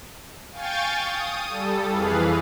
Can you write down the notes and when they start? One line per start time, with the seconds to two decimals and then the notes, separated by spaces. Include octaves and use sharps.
0.52 F5 G5 G#5 C#6 G6 A6
1.02 D#6
1.48 G3 A4
1.88 F2 E3 G#4 B4 F5